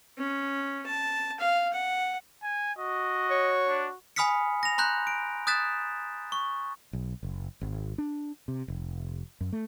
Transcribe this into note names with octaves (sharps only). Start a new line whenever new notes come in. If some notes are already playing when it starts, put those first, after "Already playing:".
C#4
A5
F5
F#5
G#5
F#4 D#5
C#5
D4
G#5 B5 D#6 F6 B6 C#7
A#6 F7
A#5 C6 F#6 G6
D7
D#6 F#6 G6 A6 B6 E7
C#6
B1
F#1
G#1
D4
C3
F1
F#2
A3